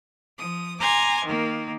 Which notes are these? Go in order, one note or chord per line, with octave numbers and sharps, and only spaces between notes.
F3 D#6
G#5 A#5 C6 D6 G#6
D#3 A#3